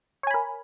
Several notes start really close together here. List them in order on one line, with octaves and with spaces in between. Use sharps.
C#5 G#5 B5 A#4